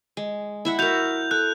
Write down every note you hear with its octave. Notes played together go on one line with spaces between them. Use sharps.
G#3
E4 E5 F#5
F#4 A#4 G6 F7
A4 F#6